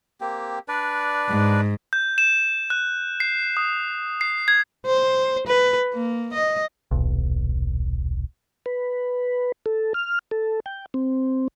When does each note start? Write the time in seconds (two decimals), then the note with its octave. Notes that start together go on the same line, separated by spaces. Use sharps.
0.21 A#3 C4 G4
0.68 D4 B4 D5
1.29 G#2
1.93 G6
2.18 E7
2.70 F#6
3.20 C7
3.57 D#6
4.21 C7
4.48 G#6
4.86 C5
5.47 B4
5.94 A#3
6.33 D#5
6.91 D#1 B1
8.66 B4
9.66 A4
9.94 F6
10.31 A4
10.66 G5
10.94 C4